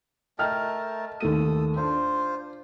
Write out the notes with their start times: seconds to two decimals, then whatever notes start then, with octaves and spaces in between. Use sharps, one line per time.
0.39 A3 A#4 D#5 G5 A5 F6
1.20 D#2 A3 A4 D#6 D#7
1.77 D4 F4 C5